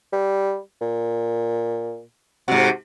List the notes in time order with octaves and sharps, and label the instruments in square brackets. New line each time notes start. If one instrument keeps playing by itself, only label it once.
[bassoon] G3
A#2
[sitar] G#2 C3 [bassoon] F#4